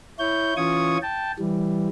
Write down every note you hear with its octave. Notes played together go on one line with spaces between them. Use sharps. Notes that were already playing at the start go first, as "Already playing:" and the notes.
E4 C#5 G6
E3 C#4 F4 C#6 D#6 G#6
G5 A5
E3 G3